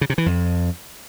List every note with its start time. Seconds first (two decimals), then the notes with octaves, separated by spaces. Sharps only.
0.01 C#3
0.10 C3
0.18 E3
0.26 F2